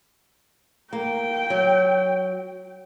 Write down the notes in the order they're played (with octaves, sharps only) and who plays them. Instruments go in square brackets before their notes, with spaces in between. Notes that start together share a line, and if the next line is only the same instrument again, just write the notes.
[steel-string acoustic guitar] A#3 [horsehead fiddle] G5
[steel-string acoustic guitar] F#3